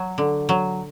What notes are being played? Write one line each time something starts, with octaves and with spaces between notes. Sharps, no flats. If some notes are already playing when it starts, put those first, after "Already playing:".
Already playing: F#3
D3
F#3